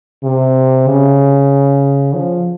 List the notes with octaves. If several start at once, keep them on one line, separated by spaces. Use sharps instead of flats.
C3
C#3
F3